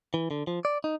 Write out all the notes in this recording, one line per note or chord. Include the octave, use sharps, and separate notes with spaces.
E3
D3
F3
D5
D#4